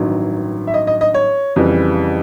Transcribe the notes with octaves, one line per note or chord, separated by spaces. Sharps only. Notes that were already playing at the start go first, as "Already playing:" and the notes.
Already playing: A1 G2 D#3 F#3
E5
D#5
D#5
D#5
C#5
F2 C#3 E3 G3